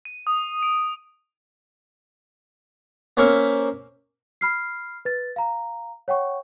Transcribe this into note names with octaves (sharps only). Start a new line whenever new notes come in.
D#7
D#6
D7
A#3 C#4 A#4 C5 E5 C#6
B5 F6 C7
B4 A6
F5 A#5
C#5 F#5 G5 C#6